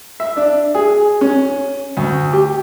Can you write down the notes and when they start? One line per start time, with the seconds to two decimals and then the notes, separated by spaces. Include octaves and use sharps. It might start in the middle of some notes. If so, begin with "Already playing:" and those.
0.20 E5
0.37 D4
0.75 G#4
1.21 C#4
1.97 D2
2.33 G4